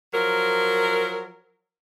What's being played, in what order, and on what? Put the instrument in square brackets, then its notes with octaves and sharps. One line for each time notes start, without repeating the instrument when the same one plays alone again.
[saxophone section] F3 F#3 A#4